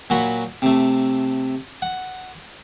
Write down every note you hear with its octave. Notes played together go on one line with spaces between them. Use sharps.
A#2 F#3 F#4 B5
C3 A3
F#5